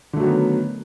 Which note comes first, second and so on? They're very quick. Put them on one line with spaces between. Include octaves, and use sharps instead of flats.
D3 A3 F#3 D#3 B3